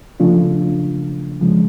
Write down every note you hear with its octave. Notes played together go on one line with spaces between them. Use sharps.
C#3 F3 A3 D4 F4
C#3 F3 G#3